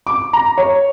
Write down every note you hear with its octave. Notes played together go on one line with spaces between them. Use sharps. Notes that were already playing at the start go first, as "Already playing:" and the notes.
D6
A#5
C#5